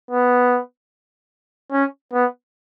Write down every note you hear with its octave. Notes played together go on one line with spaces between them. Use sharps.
B3
C#4
B3